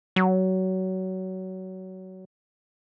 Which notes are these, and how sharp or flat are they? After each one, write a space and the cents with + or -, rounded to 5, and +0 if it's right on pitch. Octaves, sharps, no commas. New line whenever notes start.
F#3 +20